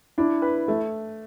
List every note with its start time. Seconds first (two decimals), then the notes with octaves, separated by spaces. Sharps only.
0.18 D4 E4
0.42 B4
0.68 A3